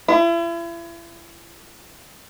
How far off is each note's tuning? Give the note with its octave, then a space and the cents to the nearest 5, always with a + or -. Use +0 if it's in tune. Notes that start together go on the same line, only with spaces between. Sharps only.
E4 +40